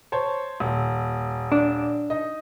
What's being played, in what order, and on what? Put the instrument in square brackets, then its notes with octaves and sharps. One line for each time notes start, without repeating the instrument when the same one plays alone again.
[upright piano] C5 C#5 A5
D#1
[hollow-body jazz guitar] D4
[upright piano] D#4 D#5